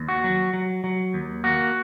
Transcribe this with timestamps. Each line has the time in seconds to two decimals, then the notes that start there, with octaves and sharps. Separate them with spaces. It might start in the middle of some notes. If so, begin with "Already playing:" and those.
Already playing: D#2
0.09 F#4
0.24 F#3
0.54 F#3
0.84 F#3
1.14 D#2
1.44 A#3 F#4